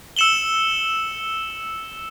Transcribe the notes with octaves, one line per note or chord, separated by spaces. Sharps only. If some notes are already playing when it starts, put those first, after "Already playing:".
E6 C#7 E7 F#7 G7